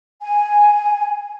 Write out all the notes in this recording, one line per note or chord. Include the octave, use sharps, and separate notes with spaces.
G#5